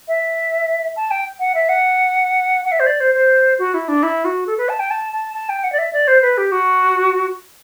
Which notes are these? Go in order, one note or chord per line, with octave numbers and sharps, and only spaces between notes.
E5
A5
G5
F#5
E5
F#5
F#5
E5
C5
D5
C5
C5
F#4
E4
D4
E4
F#4
A4
B4
A5
G5
A5
A5
A5
G5
F#5
D5
E5
D5
C5
B4
G4
F#4